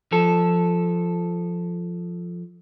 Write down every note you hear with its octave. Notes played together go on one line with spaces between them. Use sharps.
F3 A4